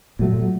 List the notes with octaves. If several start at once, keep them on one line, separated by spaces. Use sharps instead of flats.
A#2 F#3 A3